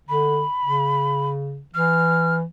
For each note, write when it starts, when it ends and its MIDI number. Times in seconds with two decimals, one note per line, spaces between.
0.09 0.43 50
0.09 1.29 83
0.65 1.61 49
1.75 2.43 52
1.75 2.36 89